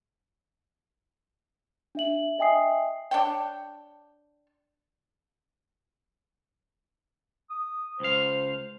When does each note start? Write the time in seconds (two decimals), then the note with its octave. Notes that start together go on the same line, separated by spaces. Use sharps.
1.95 D4 E5 F#7
2.38 D#5 E5 G5 G#5 D#6 C7
3.11 D4 C#5 G5
7.50 D#6
8.00 C#2 C5 F5